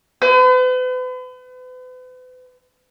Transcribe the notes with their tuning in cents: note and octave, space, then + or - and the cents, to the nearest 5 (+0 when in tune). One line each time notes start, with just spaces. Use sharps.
B4 +40